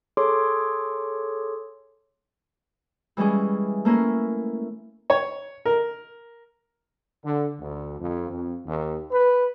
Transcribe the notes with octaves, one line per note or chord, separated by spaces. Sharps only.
G#4 A4 C#5 C6 D6
E3 G3 G#3 C#4 G#4
A3 A#3 C#4 E4 A#4
C#5
A#4
D3
D2
F2
F2
D#2
B4